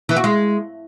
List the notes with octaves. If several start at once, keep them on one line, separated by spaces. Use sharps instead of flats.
E3
F#4
G#3